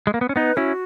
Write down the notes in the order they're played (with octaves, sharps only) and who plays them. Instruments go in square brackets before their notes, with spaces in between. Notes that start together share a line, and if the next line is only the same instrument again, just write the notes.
[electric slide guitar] G#3
A#3
B3
C#4
[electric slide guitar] B3 D#4 [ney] B4
[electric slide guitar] C#4 E4 [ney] F#4